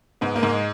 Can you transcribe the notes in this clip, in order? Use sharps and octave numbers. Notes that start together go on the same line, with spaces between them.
G#2 B3
A#3
G#2
G#3